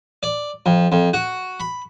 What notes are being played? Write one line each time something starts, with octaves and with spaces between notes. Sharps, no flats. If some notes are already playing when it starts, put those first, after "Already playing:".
D5
F2
F2
F#4
B5